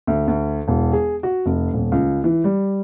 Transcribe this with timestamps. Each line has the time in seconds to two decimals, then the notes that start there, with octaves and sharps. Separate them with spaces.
0.07 D2
0.28 D2
0.68 E1
0.93 G#4
1.23 F#4
1.46 F1
1.74 D#1
1.92 C#2
2.24 E3
2.44 G3